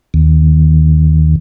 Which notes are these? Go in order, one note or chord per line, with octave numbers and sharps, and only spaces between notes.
D#2